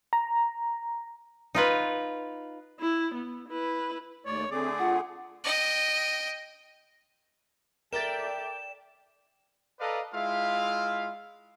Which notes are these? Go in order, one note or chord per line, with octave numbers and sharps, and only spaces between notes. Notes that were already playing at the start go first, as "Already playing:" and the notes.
A#5
D#4 F4 B4
E4
B3
E4 B4
D#2 A3 C#5 D5
D3 A3 C4 G#4 D5
F4 F#5
D#5 G5
A4 A#4 D5 E5 G5 A6 E7
A4 B4 D5 D#5 F5 A#5
G#3 E4 F4 E5 F5